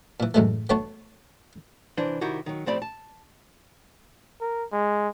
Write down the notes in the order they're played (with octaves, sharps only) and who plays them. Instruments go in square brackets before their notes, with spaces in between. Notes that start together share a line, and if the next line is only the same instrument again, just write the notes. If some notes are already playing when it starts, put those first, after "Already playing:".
[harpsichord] A#2 E3
C#2 F#2 A2 E3 G#3 A3
A3 B3 D4 F#4 C#5 A5
[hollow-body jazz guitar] C2 E3 D4 C5
C2 D#3 E4 F#4 G4
D#3 F#3
A2 F3 C4 G4 D5 B5
A5
[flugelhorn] A#4
G#3